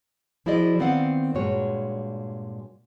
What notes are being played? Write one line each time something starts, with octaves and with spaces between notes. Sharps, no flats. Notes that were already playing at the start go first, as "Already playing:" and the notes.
F3 E4 F#4 G#4 D5 D#5
D#3 B3 C4 D5 F5 F#5
G2 A#2 G#3 F#4 C#5